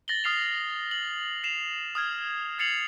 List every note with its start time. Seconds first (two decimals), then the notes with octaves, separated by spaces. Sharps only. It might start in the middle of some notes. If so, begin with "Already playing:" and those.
0.08 A6 A#6 F#7 G7
0.24 D#6 F6 C7 F7
0.91 F#7
1.44 C7 E7 F7
1.95 D#6 F6 G#6
2.58 F6 A6 C7 C#7 F7 F#7